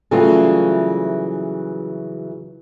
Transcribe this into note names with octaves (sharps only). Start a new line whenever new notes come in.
C#3 E3 F#3 G3 A3 F4